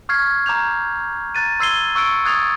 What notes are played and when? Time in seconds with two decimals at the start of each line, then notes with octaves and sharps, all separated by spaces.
0.09 C#6 F6 G#6 C7
0.46 A#5 D6 G6 F7
1.35 A#5 F#6 A6 D#7
1.60 C6 E6 G#6 C7 D#7 G7
1.95 C#6 E6 F#6 C#7 D7
2.25 D#6 F#6 G#6 A6 C7 F7